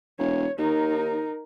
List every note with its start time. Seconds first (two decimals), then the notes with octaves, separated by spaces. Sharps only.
0.19 E1 C#5
0.58 D#2 D#4 A#4